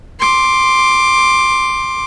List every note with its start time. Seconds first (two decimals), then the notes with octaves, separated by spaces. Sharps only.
0.20 C6 D6